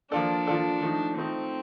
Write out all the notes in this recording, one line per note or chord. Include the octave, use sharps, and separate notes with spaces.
F3 A#3 D4 F4 A4 D5
F3 A#3 F4 A4 D5
F3 A3 D#4
F3 A3 C4 D#4